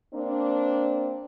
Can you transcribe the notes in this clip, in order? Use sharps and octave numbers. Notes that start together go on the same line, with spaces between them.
A#3 C4 D4